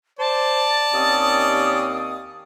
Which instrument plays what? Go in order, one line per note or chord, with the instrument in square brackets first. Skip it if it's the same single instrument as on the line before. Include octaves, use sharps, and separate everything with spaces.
[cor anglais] C5 [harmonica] D5 [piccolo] A5
[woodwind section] D#2 C4 D#6 [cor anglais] C#4